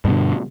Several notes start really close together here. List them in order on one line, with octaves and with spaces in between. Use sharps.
G2 B2 D3